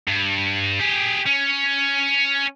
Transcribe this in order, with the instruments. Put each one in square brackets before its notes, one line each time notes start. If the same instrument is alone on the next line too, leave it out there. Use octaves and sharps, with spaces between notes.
[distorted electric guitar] G2
G4 G#4
C#4